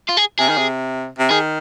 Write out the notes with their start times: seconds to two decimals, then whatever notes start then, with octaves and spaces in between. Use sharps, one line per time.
0.09 F4
0.17 G#4
0.39 C3 G#4
0.49 D#3
0.58 C3
1.19 C3
1.31 D#3 G#4